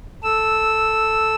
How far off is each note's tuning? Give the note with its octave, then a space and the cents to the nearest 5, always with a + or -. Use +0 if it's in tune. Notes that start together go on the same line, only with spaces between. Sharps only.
A4 +0 E6 -5